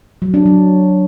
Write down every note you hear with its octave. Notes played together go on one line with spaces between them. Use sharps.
F#3
D4
F#3